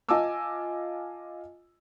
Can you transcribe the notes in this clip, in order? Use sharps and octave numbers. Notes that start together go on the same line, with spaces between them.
F4 D#5 G#5 A5 D6 E6